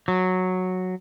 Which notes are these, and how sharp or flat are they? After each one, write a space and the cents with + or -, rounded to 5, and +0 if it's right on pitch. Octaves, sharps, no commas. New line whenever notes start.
F#3 -5